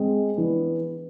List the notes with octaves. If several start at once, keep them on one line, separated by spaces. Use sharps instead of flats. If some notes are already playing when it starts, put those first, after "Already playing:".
Already playing: G#3 C4 G#4
E3 B3 D4